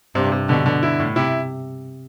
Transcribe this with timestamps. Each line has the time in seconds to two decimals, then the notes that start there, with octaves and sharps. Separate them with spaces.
0.15 G2 C3
0.32 C3
0.48 B2 D3
0.66 D3
0.83 E4
1.00 A2
1.16 C3 E4